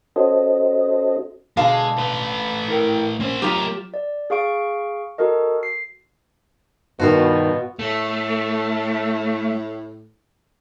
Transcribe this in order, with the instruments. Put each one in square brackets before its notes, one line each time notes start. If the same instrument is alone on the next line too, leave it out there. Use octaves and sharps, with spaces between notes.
[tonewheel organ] C#4 F#4 A4 C5 D#5
[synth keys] B2 C6 [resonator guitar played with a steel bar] D3 F5 A5 [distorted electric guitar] G#3
[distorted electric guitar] A3 B4
[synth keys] E4 A#4 G5
[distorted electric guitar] A#3 C5 [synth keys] C#4
[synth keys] F#3 E7 [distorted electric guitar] A3 A#4 [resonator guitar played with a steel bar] F4 G4
[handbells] D5
G#4 F5 C#6 D7
F#4 A4 A#4 D#5
C7
[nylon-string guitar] G2 D#3 [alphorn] B2 [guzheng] B3 F4 F#4
[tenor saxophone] A2 [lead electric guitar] A3